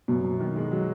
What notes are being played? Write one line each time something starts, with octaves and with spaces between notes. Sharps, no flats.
F#2 B2
F#2
D#3
G#3
F#3